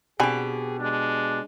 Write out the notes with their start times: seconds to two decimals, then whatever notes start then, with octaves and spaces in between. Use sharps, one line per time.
0.20 B2 D3 C4 G4 G#4 G#5
0.80 G#3 D4